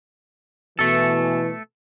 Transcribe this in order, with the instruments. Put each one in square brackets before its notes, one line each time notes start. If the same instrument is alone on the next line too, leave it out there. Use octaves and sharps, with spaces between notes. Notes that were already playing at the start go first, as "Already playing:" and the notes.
[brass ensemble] B2 E3 [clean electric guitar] A3 A4